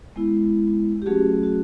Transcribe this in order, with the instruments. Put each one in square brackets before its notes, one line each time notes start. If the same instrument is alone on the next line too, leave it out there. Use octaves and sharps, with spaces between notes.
[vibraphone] G#3 B3 E4
G4
F#3 A3 C#4 F#4 G#4
F#4